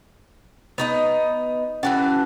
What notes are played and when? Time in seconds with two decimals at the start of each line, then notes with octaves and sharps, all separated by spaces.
0.78 B3 D#4 D#5
1.83 E3 C#4 F#4 F#5 G5 A5